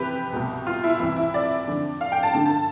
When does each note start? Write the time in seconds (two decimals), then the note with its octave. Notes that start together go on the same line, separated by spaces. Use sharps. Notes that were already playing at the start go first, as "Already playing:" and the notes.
Already playing: F2 C3 E3 G4 B4
0.33 C2 B2
0.67 F4
0.84 E4
1.00 C2 C3 E3 E4
1.16 E4
1.34 D5
1.67 F2 D3
2.01 F5
2.12 G5
2.23 A5
2.35 G2 D3
2.46 A5